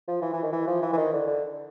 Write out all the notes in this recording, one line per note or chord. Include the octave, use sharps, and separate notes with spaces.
F3
E3
E3
D#3
E3
F3
E3
E3
D#3
D3
D3